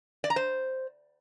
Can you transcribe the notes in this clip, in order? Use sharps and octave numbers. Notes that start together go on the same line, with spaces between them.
D5
A#5
C5